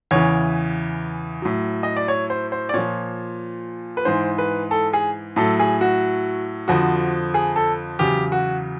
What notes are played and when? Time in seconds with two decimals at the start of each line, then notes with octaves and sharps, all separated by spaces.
0.11 E2 C#3 E3 C#5
1.42 A2 F#3
1.83 D#5
1.97 D5
2.08 C#5
2.30 C5
2.52 C5
2.69 D5
2.74 A#2 F3 C#5
3.97 B4
4.05 G#2 E3 C5
4.38 B4
4.71 A4
4.93 G#4
5.36 A2 F#3 A4
5.59 G#4
5.81 F#4
6.68 F2 D3 F3 F#4
7.34 G#4
7.56 A4
7.99 E2 C#3 F#3 G4
8.32 F#4